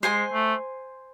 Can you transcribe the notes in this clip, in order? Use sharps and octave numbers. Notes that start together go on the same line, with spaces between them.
G#3 C5 G#5 C6
A3